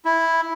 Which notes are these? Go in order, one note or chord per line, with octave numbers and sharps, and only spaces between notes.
E4